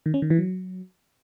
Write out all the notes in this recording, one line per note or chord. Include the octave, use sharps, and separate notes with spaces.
D#3
C#4
D#3
E3
F#3